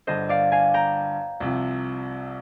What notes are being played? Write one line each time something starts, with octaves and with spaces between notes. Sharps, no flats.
G1 G2 D3 C5 D#5
D5 F5
F5 G#5
G5 A#5
C2 C3 F3